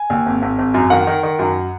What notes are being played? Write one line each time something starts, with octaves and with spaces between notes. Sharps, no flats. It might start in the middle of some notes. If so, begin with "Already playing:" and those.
Already playing: G#5
D#2
G#1
G#1
G#1
F#2
D#3 F#5
D#3
D#3
F#2